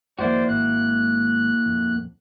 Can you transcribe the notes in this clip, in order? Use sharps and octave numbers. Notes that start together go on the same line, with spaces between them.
F2 D3 D#3 A#3 E4 F#4 C5 D5
G#1 F#6
D#1 F2